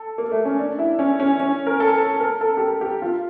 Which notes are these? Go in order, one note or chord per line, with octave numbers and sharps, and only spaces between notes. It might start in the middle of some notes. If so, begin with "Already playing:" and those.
Already playing: A4
A#3
A3
C#4
D4
E4
C#4
C#4
C#4
A#4
A4
A#4
A#4
A4
G4
A4
G4
F4